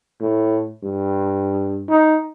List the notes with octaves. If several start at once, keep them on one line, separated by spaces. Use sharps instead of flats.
A2
G2
D#4